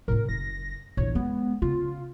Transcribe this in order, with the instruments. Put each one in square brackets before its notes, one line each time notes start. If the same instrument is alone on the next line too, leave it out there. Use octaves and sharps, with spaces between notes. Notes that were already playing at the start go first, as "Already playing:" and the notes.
[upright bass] A2 C4 [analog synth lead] A#4
[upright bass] F#1 [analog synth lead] A#6
[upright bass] A#1 E2 [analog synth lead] C#5
[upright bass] G#3 [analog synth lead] B3
[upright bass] C#3 [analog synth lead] F4